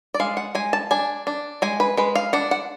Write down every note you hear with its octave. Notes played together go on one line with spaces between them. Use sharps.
D5
G#3 F5
F#5
G#3 G#5
A5
D4 G#5
D4
G#3 G#5
B4
G#3 B4
F5
D4 F#5
F#5